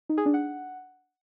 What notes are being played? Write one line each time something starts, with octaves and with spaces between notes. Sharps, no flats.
D#4
G#4
D4
F#5